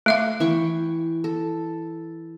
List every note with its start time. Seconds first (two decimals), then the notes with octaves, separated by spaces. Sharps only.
0.06 A3 E5 F5
0.40 E3 G5 C#6
1.24 A4